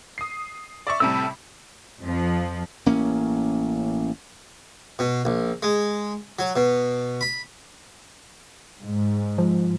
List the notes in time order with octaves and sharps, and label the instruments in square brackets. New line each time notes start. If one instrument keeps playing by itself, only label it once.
[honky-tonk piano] D#6 C7
D5 E5 C#6
[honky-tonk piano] A2 C3 G3 [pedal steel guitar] A5 E6
[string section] F2 F3
[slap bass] A1 A#3 C#4
[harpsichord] B2
A#1
G#3
F#3
B2
B5
[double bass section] G#2
[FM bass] F3